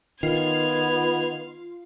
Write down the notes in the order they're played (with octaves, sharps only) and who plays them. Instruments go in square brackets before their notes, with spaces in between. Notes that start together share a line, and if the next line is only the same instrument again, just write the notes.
[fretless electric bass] D#3 [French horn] B3 [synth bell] F4 [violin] G#6 F7